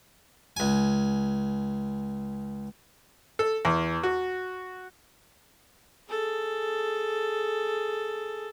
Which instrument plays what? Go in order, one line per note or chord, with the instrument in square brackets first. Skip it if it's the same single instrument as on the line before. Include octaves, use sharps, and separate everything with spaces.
[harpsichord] C#2 G#5
[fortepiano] A4
E2
F#4
[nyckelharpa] G#4 A4